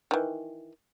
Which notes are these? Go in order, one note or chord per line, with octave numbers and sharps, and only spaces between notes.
D#3 E3